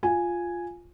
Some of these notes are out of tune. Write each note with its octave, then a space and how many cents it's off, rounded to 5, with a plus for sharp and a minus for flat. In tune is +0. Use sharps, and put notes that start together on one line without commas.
F4 +0 G#5 +0